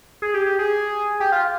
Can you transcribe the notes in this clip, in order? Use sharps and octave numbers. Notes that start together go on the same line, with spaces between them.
G#4
G4
G4
G#4
G4
F4